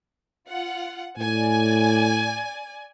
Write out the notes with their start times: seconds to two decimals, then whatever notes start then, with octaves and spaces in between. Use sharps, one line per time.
0.48 F4 F#5
1.18 A2 D5 G#5